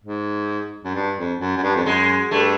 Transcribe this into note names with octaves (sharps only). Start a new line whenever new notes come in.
G#2
F#2
G2
F2
F#2
F#2
G2
F2
F#2 G#3
G2 A3